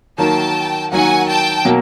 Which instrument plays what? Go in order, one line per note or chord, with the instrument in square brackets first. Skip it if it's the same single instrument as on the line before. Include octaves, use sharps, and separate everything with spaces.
[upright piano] D#3 F#3 A#3 [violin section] G5 A5
[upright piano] D#3 F#3 A#3 [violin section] F#5 G#5
[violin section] G5 A5
[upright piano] B2 F#3 A#3